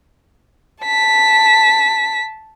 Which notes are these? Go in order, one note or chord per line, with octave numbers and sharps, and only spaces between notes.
A5 B6